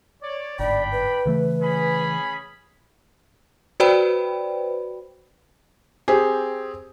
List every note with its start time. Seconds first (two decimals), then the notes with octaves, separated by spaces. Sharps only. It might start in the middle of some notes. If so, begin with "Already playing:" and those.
0.22 C#5 D5
0.59 G1 G#2 D4 D5 G5 B5
0.92 B4
1.25 C#3 E3 A3
1.62 C#4 G#4 B5
3.80 F#4 B4 C5 D5 G5 B5
6.08 C4 G4 G#4